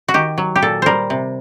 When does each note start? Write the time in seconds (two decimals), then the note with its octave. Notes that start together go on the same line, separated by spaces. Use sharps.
0.08 F#4
0.14 D#3 G4
0.38 F#3
0.56 G4
0.62 A#2 A4
0.82 G3 A#4 C5
1.10 C3